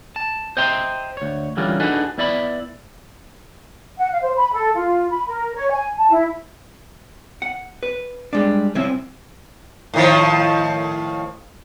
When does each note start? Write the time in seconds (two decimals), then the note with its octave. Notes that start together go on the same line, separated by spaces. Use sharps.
0.16 A5
0.57 C5 D#5 E5 G5 A#5 C6
1.17 D2 C#5
1.57 D3 E3 G3 C#4 F4 A#4
1.80 D4 D#4 F#4 G#4 A4 B4
2.18 B3 E4 D5 E5 F5 B5
3.98 F#5
4.11 F5
4.22 C5
4.37 B5
4.53 A4
4.75 F4
5.11 B5
5.27 A#4
5.55 C#5
5.71 G#5
5.97 A5
6.11 E4
7.42 F#5
7.83 B4
8.33 G3 G#3 D4
8.75 C2 F3 C4 C#4 E4 E5
9.94 A2 D#3 F3